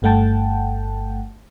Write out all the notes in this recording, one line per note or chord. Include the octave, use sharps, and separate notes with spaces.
G1 G2 A3 F#5 G5 A5